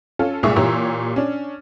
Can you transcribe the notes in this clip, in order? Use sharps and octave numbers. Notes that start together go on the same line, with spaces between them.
C#4 F4 A4
C2 A#2 G#3 G#4 E5 C#6
A#2 E3 G4 C#5 A#5 E6
C#4 D4